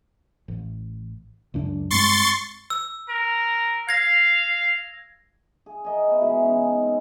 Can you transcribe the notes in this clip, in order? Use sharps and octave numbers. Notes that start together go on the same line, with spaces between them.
A1
C#2 F#2 D4
G2 G#3 C4 C6 C#6 A6
E6
A#4
F5 G#6 A#6
G#4
A#4 D#5 G#5
B3 E4 G#4
B2 E3 G#3
C#4 D#4
C4